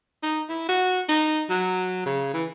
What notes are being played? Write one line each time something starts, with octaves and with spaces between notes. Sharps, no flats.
D#4
E4
F#4
D#4
F#3
C#3
E3